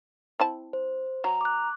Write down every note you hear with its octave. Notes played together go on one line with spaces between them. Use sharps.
C4 E4 A5
C5
F#3 A#5
D6 F#6